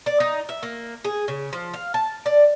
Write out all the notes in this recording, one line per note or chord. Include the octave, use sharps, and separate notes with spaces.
D5
D#4
E5
A#3
G#4
C#3
F3
F5
A5
D5